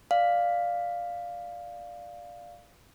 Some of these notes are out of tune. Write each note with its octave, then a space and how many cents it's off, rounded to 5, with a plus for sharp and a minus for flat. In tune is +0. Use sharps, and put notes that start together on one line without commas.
D5 +5 F5 +0